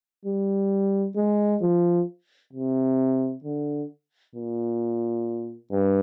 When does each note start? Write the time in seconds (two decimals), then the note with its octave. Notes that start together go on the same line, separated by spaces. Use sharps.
0.25 G3
1.16 G#3
1.62 F3
2.53 C3
3.44 D3
4.35 A#2
5.71 G2